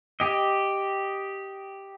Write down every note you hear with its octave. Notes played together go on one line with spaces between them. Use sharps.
G4 D#5